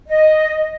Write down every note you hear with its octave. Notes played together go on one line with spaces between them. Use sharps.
D#5